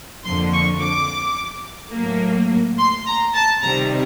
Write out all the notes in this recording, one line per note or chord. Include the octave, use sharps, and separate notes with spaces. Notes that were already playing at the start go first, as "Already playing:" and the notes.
F2 D3 F3 A#3 C6
C#6
D6
A2 F#3 A#3
C6
A#5
A5
C3 D#3 G3 A#5